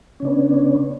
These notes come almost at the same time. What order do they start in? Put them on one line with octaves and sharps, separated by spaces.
C#4 C#3 D4 B3